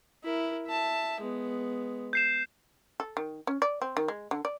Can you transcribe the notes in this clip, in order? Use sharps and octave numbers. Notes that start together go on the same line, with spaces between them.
E4 A#4
E5 A5
G#3 B3
G6 C7 E7
A4
D#3
C#4
D5
C4
D#3
G#3
D3
D5